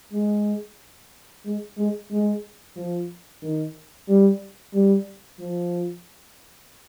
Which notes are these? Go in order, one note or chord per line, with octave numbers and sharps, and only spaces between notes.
G#3
G#3
G#3
G#3
F3
D#3
G3
G3
F3